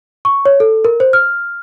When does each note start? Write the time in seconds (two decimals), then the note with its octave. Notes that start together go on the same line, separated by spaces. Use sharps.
0.25 C#6
0.45 C#5
0.60 A4
0.85 A#4
1.00 C5
1.13 F6